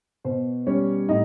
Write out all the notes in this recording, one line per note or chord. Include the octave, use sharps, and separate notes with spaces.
B2 C5
G3 C#4 C#5
A2 D#4 D#5